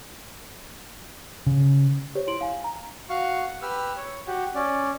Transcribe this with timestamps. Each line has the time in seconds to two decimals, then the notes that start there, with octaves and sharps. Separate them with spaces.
1.47 C#3
2.15 G4 C5 C#5
2.27 E4 C6 D7 F#7
2.41 F5 G#5
2.64 A#5
3.10 F#4 F5 C#6
3.48 F#5
3.62 G4 B4 E6 F6
3.97 C#5
4.27 F#4 G4
4.55 C#4 D5